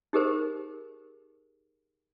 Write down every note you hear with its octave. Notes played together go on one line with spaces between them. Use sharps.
D#4 G4 G#4 A#4 C5